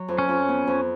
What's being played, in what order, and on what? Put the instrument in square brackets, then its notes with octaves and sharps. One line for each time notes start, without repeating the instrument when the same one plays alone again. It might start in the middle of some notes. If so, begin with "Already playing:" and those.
Already playing: [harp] F#3
F2
[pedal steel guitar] C#4
[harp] F2
B3
F2